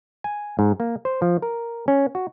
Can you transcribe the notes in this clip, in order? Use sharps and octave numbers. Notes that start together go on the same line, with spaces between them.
G#5
G#2
A#3
C5
F3
A#4
C#4
F#4